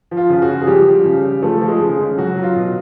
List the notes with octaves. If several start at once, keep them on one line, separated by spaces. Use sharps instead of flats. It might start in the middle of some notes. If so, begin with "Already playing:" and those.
F3
F4
C#3 F4
F#4
C#3
G#4
F3 G3 G4
F3
C#3
C#3
F3 A3 A4
F3
G#3 G#4
C#3
C#3
F#3 F#4
F#3
F4
B2